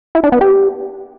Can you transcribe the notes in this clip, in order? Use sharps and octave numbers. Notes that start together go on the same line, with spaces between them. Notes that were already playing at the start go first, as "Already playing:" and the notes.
E4
D4
B3
G4